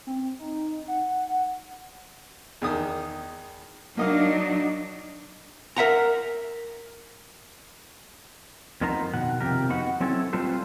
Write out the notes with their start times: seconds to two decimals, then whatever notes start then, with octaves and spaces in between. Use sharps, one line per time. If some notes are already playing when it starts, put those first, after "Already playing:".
0.07 C4
0.39 D#4
0.88 F#5
2.62 E2 D#3 D#6
3.97 F#3 A#3 D4 D#4 D#5 F5
5.77 A#4 E5 F#5 A#5
8.81 F2 B3 D#4 A#4 C5 A#5
9.13 B2 D#3 F#5
9.40 F2 C3 G4 A#4
9.69 B3 D#4 F#4 F#5
10.00 F#3 C4 C#4 E4 A4
10.33 G3 C4 F4 A4 B4 C5